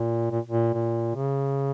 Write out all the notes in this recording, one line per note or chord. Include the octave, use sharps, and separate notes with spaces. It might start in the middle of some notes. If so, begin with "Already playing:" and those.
Already playing: A#2
A#2
A#2
A#2
C#3